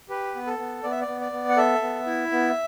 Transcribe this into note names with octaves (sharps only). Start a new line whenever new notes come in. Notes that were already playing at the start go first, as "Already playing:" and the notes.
G4 B4
B3
A4
B3
B3 D5
E5
D5
B3
D5
B3
F#5
A4 E5
B3
E4
B3